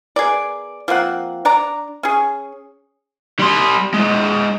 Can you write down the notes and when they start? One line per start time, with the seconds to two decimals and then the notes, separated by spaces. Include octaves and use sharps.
0.16 B3 G#4 A#4 D5
0.88 F3 A#3 C4 F#5
1.45 D4 D5 A#5
2.03 C#4 G#4
3.39 G3 C6
3.94 G#3 E4